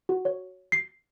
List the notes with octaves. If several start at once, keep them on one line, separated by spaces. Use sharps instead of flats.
F#4
C#5
C7